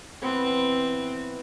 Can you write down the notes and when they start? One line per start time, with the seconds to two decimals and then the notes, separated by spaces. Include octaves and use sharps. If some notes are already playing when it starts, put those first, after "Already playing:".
0.22 E3 B3 C4